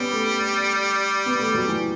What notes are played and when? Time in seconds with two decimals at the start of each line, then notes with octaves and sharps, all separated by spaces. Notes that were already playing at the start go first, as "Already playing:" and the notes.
Already playing: G3 B3 C#4
0.12 A3
1.26 B3
1.39 A3
1.55 F#3
1.68 E3